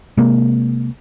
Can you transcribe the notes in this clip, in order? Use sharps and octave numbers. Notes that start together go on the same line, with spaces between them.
C3 G#3 A#3